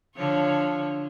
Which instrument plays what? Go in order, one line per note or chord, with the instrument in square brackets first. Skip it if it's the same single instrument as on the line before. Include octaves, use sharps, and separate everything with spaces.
[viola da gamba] D3 F3 C#5